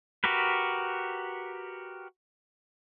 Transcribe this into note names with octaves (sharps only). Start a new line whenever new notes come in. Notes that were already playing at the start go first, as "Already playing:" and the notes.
F#4 G4 A#4 B4